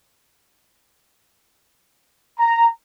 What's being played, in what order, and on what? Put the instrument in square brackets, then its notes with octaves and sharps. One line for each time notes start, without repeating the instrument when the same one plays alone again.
[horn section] A#5